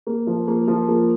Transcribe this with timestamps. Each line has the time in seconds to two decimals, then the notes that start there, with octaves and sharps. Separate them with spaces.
0.07 A#3
0.27 F3
0.48 A#3
0.68 F3
0.88 A#3